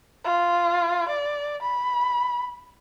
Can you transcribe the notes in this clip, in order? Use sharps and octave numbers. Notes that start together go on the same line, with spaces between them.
F4
D5
B5